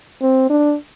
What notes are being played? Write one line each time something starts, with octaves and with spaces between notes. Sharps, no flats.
C4
D4